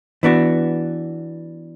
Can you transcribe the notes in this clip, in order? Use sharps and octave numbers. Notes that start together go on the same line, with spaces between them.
E3 B3 D4 F#4